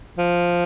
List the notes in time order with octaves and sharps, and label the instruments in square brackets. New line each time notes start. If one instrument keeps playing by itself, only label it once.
[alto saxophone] F3